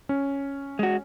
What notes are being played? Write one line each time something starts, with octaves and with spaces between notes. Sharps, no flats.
C#4
G#3 F#4